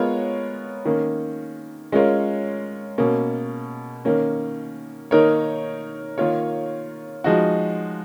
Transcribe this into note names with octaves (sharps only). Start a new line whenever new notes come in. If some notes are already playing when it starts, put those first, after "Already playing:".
Already playing: G#3 B3 F4 A#4 C#5
D#3 A#3 C#4
G#3 C#4 F4 A#4 C#5
B2 A#3 C#4
D#3 A#3 C#4
D#3 A#3 D#4 A#4 C#5
D#3 A#3 F4 A#4 C#5
F3 G#3 D#4 F#4